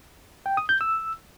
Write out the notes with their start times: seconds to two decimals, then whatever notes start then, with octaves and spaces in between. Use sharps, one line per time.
0.46 G5
0.57 D#6
0.69 G6
0.81 E6